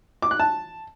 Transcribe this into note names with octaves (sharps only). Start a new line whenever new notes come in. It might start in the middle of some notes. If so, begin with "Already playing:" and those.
D6
F#6
A5